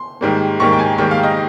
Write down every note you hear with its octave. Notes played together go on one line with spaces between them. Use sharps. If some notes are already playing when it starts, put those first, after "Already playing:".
Already playing: C6
G#2 D#3 G3 A#3
G#2 D#3 G3 A#3 C#6
G5
G#5
G#2 D#3 G3 A#3 G5
F5
D#5